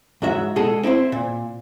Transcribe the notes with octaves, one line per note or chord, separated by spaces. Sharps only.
G#2 F#3 F#4 E5
B2 G#3 G#4 A4
C4 E4 B4 C5
A#2